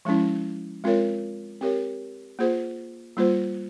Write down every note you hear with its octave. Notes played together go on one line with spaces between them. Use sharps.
F3 G#3 C#4 E4
G#3 C4 F4 A#4 C#5
C4 G4 A#4 C#5
A#3 F4 G#4 C5
G3 A#3 F4 C5